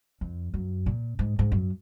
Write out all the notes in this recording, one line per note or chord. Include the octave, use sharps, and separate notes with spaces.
F2
F#2
A#2
G#2
G#2
F#2